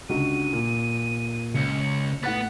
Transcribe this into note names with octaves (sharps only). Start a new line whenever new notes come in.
C#2 D3 F#4 D#7
A#2
C#2 C#7
A2 B3 F#5 F#6 A6